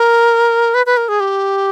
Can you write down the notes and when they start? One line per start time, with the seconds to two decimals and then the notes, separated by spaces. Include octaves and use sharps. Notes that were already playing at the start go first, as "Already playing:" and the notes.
Already playing: A#4
0.74 B4
0.86 B4
0.97 A#4
1.08 G#4
1.20 G4